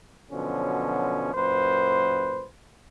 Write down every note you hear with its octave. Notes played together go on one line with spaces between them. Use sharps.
B2 D3 F3 F#3 C#4
F#2 A#2 B4 C5